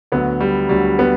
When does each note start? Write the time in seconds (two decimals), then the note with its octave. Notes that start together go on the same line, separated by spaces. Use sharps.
0.12 D2 D3 F#3 B3
0.40 G3
0.69 D2 D3 F#3 G3
0.99 B3